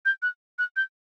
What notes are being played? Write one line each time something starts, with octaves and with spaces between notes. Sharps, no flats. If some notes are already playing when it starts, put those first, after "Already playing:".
G6
F#6
F#6
G6